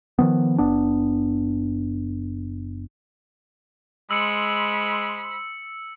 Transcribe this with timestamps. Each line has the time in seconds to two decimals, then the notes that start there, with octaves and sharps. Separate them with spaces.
0.19 D#3 F3 B3
0.58 F#1 B3 D4
4.11 G#3 C5 B5 E6 C#7